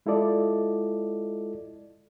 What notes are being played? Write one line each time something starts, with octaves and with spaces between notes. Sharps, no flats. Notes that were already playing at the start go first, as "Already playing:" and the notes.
G#3 E4 F4 A4 D5 D#5